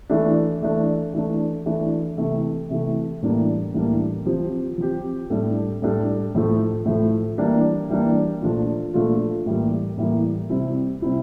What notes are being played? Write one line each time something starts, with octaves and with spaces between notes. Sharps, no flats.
E3 A3 D4
E3 A3 D4
E3 A3 D4
E3 A3 D4
C3 E3 A3
C3 E3 A3
A2 E3 G3 A#3 D4
A2 E3 G3 A#3 D4
F3 C4 G4
F3 C4 G4
A2 G3 D4 A4
A2 G3 D4 A4
A2 F3 A3
A2 F3 A3
E3 G3 A#3 D4
E3 G3 A#3 D4
A#2 F3 A3 D4 F4
A#2 F3 A3 D4 F4
A2 E3 G3 A#3
A2 E3 G3 A#3
C3 G3 C4 E4
C3 G3 C4 E4